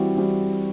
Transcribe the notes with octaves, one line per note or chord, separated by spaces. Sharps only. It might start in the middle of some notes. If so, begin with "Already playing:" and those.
Already playing: E3 G3 C4 F#4
E3 G3 C4 F#4